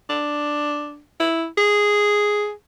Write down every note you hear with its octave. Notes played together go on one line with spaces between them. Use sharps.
D4
E4
G#4